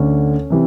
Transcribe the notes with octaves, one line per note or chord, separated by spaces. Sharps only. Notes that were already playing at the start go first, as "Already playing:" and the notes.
Already playing: D2 D3 C#4
C3 E3